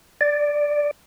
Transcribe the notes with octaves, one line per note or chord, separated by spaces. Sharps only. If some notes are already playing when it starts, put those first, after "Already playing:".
D5